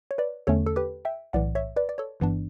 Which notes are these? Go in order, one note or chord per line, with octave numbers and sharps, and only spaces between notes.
C#5
B4 D5
E2 D3 A3 C#4 A4 C#5
A4
G4 B4
E5 G5
B1 A2 E3 D5 F#5
C#5 E5
B4 D5
D5
A4 C#5
G1 G2 E3 B3 D4